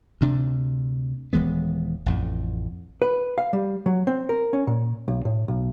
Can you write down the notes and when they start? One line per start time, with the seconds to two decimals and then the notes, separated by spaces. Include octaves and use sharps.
0.21 D2 C3 D4
1.33 D#1 E3 G#3 B3
2.06 A1 F2 A2
3.02 B4
3.38 F5
3.53 G3
3.86 F#3
4.07 C4
4.29 A#4
4.53 C#4
4.67 A#2
5.08 B1
5.25 A2
5.48 B1